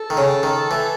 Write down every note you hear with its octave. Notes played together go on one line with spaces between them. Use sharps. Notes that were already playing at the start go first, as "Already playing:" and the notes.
Already playing: A4
D#3
C#3
D#3
E3